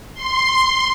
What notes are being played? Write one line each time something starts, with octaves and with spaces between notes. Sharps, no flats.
C6